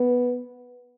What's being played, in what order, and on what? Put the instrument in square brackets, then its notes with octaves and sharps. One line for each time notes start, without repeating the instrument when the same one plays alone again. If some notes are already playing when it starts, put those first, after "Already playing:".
Already playing: [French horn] B3